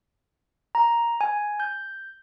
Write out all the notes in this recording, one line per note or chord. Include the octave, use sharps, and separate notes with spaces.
A#5
G#5
G6